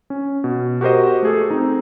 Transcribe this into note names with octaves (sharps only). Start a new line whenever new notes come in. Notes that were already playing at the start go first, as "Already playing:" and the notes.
C#4
B2
F#4 G4 A#4 C5 D#5
A3 G#4 A4
C4 D#4